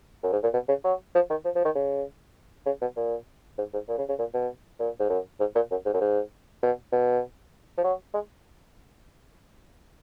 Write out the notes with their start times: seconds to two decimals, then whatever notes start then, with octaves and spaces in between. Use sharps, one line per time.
0.24 F#2
0.33 G#2
0.43 A#2
0.54 B2
0.68 C#3
0.84 F#3
1.15 F3
1.30 D#3
1.45 F3
1.55 F3
1.65 D#3
1.75 C#3
2.66 C#3
2.81 B2
2.96 A#2
3.58 G#2
3.73 G#2
3.88 A#2
3.98 C#3
4.09 C#3
4.19 A#2
4.34 B2
4.79 A#2
5.00 G#2
5.09 F#2
5.40 G#2
5.55 A#2
5.71 F#2
5.85 G#2
5.94 F#2
6.01 G#2
6.63 B2
6.92 B2
7.77 F3
7.84 F#3
8.14 G#3